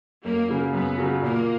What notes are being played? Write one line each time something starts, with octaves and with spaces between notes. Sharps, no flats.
F#2 A#3
C#3 F#3
F#2 B3
C#3 F#3
A#2 A#3